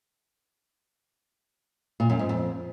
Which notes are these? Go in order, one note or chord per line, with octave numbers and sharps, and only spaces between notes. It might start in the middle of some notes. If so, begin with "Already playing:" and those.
A#2
F#2
G#2
F2